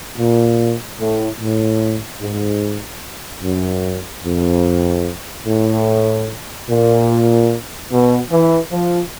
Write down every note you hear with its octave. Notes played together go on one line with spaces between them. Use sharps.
A#2
A2
A2
G#2
F#2
F2
A2
A#2
B2
E3
F3